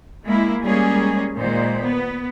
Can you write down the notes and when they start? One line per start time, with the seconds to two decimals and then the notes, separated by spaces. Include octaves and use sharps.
0.25 G#3 A#3 E4
0.63 G3 G#3 A#3 C#4 G#4
1.35 A#2 D#3 G#3 C5
1.82 B3